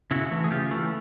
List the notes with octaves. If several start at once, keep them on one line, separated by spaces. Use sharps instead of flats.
C#3 E4 F#4
E3 A3
G#4
C#3 F4 G4
E3 A3